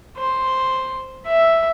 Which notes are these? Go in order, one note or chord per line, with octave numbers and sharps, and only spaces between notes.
C5
E5